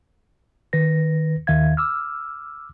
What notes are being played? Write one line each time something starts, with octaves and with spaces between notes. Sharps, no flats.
D#3 B4 A#6
D#2 D#3 E5 F5 G#6
D6 E6 F6